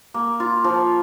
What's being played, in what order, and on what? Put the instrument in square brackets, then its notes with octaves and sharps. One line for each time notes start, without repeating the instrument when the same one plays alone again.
[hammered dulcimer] A#3
F4
F3